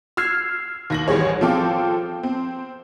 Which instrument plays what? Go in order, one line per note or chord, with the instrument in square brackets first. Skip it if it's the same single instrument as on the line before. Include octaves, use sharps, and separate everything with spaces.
[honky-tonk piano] E6 F6 G#6 C7
D#2 A#6 F#7
A1 G3 G#4 C#5
F3 C4 A4 F5 G5 D6
C4